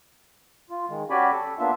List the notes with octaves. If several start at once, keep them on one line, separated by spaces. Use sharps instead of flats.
F4
D#3 G#3
C#4 F#4 G4 D5 G#5 B5
A4
A#3 B3 D4 F4 E5